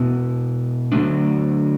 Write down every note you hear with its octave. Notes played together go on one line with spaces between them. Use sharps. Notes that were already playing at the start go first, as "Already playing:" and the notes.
Already playing: B2 B3 E4
D3 F#3 A3 D4